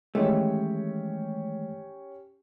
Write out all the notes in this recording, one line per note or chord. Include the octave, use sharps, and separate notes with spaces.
D#3 E3 G#3 A3 C#4 G4 C#5